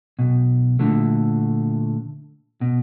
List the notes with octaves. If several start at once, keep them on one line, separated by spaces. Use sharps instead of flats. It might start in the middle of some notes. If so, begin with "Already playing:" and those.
B1 B2
A#2 D3 F3 A3
B2